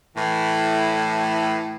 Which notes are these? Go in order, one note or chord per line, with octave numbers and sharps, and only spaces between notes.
A2 E3